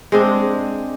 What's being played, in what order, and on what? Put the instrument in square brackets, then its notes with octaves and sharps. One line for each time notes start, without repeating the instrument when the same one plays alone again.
[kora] G#3 C4 D4